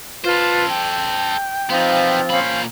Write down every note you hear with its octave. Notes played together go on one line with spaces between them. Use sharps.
F4 A4 B4 C5
G5
F3 B3 C4 D#4 F4
A#2 C#4 C5 F5 B5